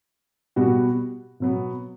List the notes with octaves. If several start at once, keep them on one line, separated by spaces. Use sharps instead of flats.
B2 G3 B3 F#4
B2 F#3 B3